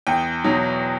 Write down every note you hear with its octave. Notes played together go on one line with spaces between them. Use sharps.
E2 G5
B2 F#3